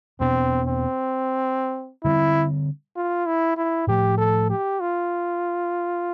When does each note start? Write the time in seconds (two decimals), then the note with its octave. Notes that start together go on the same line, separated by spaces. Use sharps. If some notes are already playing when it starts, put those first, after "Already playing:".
0.20 E2 B2 B3 C4 D4
0.67 C4
2.03 D3 G3 C4 E4
2.96 F4
3.26 E4
3.57 E4
3.87 A2 F3 A3 G4
4.18 A4
4.50 G4
4.80 F4